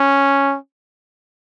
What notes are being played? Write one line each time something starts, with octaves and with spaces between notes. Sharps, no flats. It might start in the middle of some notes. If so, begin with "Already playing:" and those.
Already playing: C#4